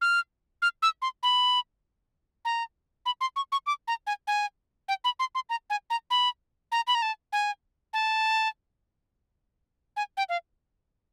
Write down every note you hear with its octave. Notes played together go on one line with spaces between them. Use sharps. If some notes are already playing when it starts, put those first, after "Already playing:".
F6
F6
E6
C6
B5
A#5
B5
C6
C#6
C#6
D6
A#5
G#5
G#5
G5
B5
C6
C6
A#5
G#5
A#5
B5
A#5
B5
A#5
A5
G#5
A5
G#5
G5
F5